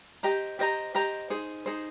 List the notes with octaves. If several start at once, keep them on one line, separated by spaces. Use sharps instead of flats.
G4 C5 D#5 A#5
G4 C5 D#5 A#5
G4 C5 D#5 A#5
D#4 G#4 C5
D#4 G#4 C5